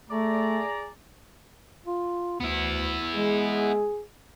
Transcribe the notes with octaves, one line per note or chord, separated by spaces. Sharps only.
A3 G#4 D5 A#5
F4
D2 B3 E4
G#3 G#4